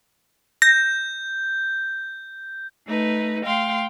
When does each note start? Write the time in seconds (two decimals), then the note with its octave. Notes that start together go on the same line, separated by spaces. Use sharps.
0.62 G6 A#6
2.86 A3 D#4 B4
3.44 A3 F5 G5 C6